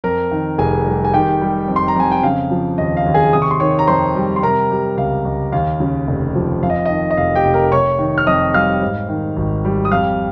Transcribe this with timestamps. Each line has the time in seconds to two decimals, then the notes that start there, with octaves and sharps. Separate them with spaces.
0.04 F2 A#4 A#5
0.32 D#3
0.58 F1 G#4 G#5
0.86 G3
1.05 G#5
1.13 D#3 G4 G5
1.41 G3
1.68 F2
1.76 C6
1.88 A#5
1.96 F2 G#5
2.11 G5
2.23 C#3 F5
2.51 F3
2.78 D#2 D#5
2.97 F5
3.06 D#2
3.14 G#4 G#5
3.33 C3 D#6
3.42 C#6
3.51 C6
3.60 D#3 C#5 C#6
3.79 A#5
3.88 F2 C5 C6
4.15 G3
4.36 C6
4.42 C3 A#4 A#5
4.70 G3
4.97 C#2 F5
5.25 C#2
5.52 D#2 F5
5.80 C#3
6.07 F1
6.35 F3
6.62 F2 F5
6.70 D#5
6.85 D#3 D#5
7.11 D#5
7.17 F1 F5
7.35 G4 G5
7.45 F1
7.54 A#4 A#5
7.72 C3 C#5 C#6
7.99 D#3
8.18 F6
8.27 F2 D#5 D#6
8.54 G3 F5 F6
8.82 G#2
9.09 D#3
9.36 G#1
9.65 G3
9.85 D#6
9.91 F2 F5 F6